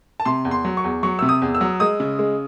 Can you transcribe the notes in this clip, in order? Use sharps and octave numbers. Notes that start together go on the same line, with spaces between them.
A5
C3 C6
E2
C6
F#3
C#6
E2
F#3 C#6
C3 E6
D#6
E2
E6
F#3
G#3 D#6
C#3
G#3